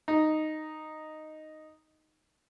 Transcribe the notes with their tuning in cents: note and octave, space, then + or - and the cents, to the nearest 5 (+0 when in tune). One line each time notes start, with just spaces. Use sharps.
D#4 -5